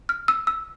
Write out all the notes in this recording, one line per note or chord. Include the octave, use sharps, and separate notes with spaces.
F6
E6
E6